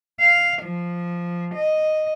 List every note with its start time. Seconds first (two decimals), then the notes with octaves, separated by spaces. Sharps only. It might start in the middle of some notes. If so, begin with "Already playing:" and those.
0.20 F5
0.63 F3
1.55 D#5